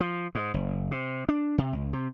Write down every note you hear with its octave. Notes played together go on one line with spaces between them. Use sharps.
F3
G#2
F#1
C3
D4
C3
C#2
C3